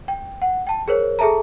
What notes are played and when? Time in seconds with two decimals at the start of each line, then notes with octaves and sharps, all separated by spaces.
0.08 G5
0.42 F#5
0.67 G5 A5
0.88 G#4 A#4 C5 C#5
1.19 G#4 A4 E5 A5 A#5